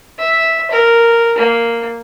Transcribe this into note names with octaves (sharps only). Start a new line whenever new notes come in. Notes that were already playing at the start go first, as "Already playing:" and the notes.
E5
A#4
A#3